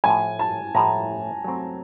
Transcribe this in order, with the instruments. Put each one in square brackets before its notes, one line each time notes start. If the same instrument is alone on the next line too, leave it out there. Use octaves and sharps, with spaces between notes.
[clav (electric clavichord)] A2 F3 A3 [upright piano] G#5
[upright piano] A5
[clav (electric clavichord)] A2 F3 A3 [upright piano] A#5
[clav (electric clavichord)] F#3 A3 C4